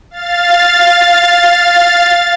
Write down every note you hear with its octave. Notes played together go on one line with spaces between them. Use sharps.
F5 A6